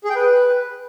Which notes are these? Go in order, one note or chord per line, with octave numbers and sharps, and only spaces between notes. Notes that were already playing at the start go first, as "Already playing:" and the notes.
G#4
G5
B4